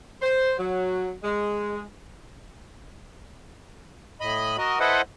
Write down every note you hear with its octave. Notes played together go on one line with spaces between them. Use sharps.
C5
F#3
G#3
A2 D#5 B5
F#4 A#4 D#5
E4 A4 B4 C5 D#5 F#5